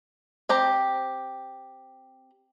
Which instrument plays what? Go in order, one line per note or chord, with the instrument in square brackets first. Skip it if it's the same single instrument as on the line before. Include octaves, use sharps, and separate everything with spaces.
[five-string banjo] C4 G4 A#5